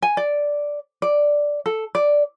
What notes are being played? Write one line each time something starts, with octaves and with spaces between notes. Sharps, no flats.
G#5
D5
D5
A4
D5